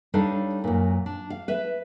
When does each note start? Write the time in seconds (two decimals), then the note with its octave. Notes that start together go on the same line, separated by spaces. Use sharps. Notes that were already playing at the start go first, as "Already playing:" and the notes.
0.14 G3 D4 D#4 A4 C#5 F5
0.64 F#2 A#2
1.06 D4
1.30 F5
1.48 B4 E5